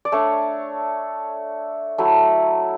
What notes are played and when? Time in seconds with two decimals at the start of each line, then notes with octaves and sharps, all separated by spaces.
0.05 D5
0.12 A3 D4 C#5
1.98 F#3 A3 E4